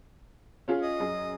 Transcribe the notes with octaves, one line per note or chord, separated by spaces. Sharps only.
C#4 F4 G#4
D#5
F#2 G#4